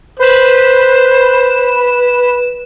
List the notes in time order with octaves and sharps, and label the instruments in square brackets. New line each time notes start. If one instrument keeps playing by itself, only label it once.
[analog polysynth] B4 E7 [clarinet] C5